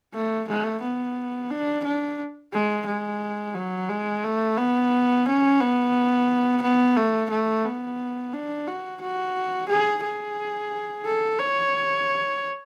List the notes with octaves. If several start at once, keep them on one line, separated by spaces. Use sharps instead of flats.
A3
A3
B3
D4
D4
G#3
G#3
F#3
G#3
A3
B3
C#4
B3
B3
A3
A3
B3
D4
F#4
F#4
G#4
G#4
A4
C#5